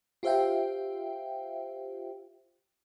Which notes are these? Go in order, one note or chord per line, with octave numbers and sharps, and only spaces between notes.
F4 G4 C5 E5 F5 G5